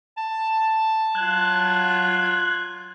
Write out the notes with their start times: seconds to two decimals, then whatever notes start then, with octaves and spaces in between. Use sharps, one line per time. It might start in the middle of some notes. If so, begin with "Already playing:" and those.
0.17 A5
1.15 F#3 F4 F#6 G#6